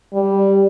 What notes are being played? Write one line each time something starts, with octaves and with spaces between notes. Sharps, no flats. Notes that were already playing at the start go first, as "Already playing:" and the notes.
G3